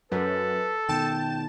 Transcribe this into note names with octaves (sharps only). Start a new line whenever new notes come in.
F#2 A4 B4
B2 D#3 G5 A5 E7